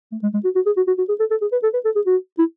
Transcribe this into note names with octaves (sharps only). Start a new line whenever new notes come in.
A3
G#3
G#3
F#4
F#4
G#4
F#4
F#4
F#4
G#4
A4
A4
G#4
B4
A4
B4
A4
G#4
F#4
E4